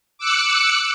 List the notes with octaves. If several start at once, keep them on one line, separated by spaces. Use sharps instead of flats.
D6 E6 F#6 C#7